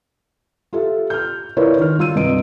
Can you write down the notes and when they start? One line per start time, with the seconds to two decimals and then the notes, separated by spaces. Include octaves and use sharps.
0.73 F4 G4 A4 E5
1.10 F6 G6
1.57 E4 F4 A#4 B4 C#5 D5
1.78 D#3 F6
1.98 G3 F4 E6 D#7
2.15 C2 G2 D#5 D7